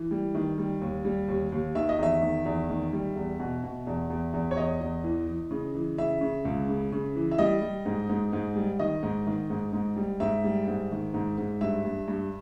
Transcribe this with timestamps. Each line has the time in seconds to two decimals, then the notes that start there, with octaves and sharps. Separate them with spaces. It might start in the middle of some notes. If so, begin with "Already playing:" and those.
Already playing: E3
0.11 G3
0.35 D#3
0.58 G3
0.82 D#2
1.05 G3
1.28 D#2
1.52 D#2
1.75 D#3 E5
1.89 D#5
1.99 E2 E5
2.22 D#3
2.45 E2
2.69 D#3
2.93 G3
3.16 E2
3.40 B2
3.64 B2
3.87 E2
4.10 E2
4.33 E2
4.51 C#5
4.56 E2 D#5
4.81 E2
5.04 E3
5.27 E3
5.51 C#3
5.74 E3
5.98 C#3 E5
6.21 C#3
6.45 C#2
6.69 C#3
6.92 C#3
7.16 E3
7.31 E5
7.38 G3 D#5
7.62 G3
7.86 G#2
8.09 G#2
8.33 G#2
8.56 G3
8.79 D#3 D#5
9.03 G#2
9.27 D#3
9.50 G#2
9.73 G#2
9.96 G3
10.20 G#2 E5
10.44 G3
10.67 G#2
10.91 D#3
11.14 G#2
11.38 G#2
11.61 G2 E5
11.85 G2
12.08 G2